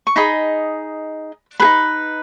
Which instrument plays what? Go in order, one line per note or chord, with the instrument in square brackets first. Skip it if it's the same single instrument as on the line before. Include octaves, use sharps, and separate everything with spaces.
[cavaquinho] C#6
D#4 G#4 D#5 B5
G#4 B4 B5
D#4